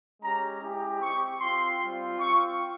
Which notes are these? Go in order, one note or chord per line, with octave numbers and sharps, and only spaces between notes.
G#3 C#4 G4 A#5
G#3 E4 G4
C4 G4 C#6
C4 F4 C6
G3 C4 F4
C4 F4 C#6